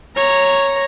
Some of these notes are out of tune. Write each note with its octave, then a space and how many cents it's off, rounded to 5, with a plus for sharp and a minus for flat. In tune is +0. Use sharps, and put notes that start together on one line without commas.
C#5 -5 A#5 +0